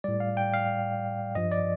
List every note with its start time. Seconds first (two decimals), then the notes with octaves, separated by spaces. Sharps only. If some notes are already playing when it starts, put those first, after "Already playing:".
0.04 A2 G3 D5
0.20 F5
0.37 G5
0.54 F5
1.35 G2 F3 D#5
1.51 D5